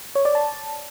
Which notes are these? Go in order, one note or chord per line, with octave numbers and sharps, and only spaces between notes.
C#5
D5
A5